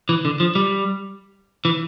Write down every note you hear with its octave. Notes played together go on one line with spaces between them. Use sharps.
E3
D3
F3
G3
E3